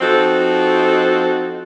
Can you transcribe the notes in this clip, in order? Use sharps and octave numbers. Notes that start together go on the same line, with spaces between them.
F3 C4 D#4 F#4 A4